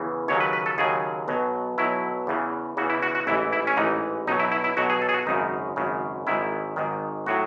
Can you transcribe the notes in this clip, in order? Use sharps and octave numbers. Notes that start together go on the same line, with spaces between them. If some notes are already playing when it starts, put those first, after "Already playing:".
Already playing: E2 C#3 E3
D#2 C#3 F#3 C#5
B4
B4
A4
D#2 C#3 F#3 G#4
B1 B2 F#3
B1 B2 F#3 E4
E2 C#3 E3
E2 C#3 E3 F#4
E4
F#4
F#4
A1 G#2 E3 E4
E4
C#4
A1 G#2 E3 D#4
B1 B2 F#3 D#4
E4
E4
E4
B1 B2 F#3 F#4
G#4
A4
G#4
F#4
G#1 F#2 C#3 D#4
G#1 F#2 C#3
G#1 G#2 D#3 E4
G#1 G#2 D#3
A2 F#3 F#4